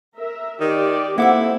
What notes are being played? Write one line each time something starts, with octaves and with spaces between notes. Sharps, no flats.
A#4 E5
D#3 G4 D5
A#3 C4 E4 A4 F#5 D6 E6